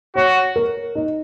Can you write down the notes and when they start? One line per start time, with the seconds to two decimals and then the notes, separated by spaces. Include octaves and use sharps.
0.16 F#4 C#5
0.56 A#4
0.95 D#4